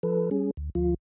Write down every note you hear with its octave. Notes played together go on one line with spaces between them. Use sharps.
F3 A4 B4
G3 C#4 G#4
D2
D2 F3 F4